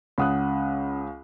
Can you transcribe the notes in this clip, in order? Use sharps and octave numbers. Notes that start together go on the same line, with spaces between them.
C#2 C#4 F#5 D#6 F#6